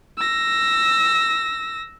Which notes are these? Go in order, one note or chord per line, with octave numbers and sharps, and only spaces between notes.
E6 A#6